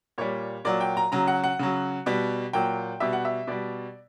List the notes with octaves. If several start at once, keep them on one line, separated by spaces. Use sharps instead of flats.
A#2 G3 C#5
A#2 F#3 D5
G5
A#5
C#3 F#3 A#5
F#5
F#5
C#3 F#3
B2 G3
A#2 F#3 G5
B2 G3 E5
F#5
E5
B2 G3 D5